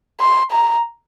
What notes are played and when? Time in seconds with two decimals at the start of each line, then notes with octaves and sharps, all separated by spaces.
0.21 C6
0.52 A#5